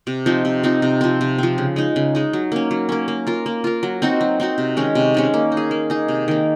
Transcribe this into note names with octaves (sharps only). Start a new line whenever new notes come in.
C3
F3 C4 D#4
C3
F3 C4 D#4
C3
F3 C4
C3
F3 C4
C#3
G#3 D#4
C#3
G#3 D#4
F#3
A#3 C#4
F#3
A#3 C#4
A#3
F4 A#4
A#3
F4 A#4
F#3
C4 D#4 F#4
F#3
C4 D#4 F#4
C3
D#3 G#3 C#4
C3
D#3 G#3 C#4
A#3
D#4
G#4
A#3
D#4 G#4
C3
D#3 A#3